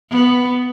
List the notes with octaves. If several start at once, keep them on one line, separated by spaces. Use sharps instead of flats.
B3